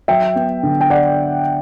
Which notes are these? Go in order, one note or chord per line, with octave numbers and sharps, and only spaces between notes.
F#3 E5 G5
B3
D3
G5
D5 F#5